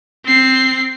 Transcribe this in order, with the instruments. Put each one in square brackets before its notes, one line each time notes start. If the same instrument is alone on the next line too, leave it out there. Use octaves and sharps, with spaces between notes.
[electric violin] C4 C7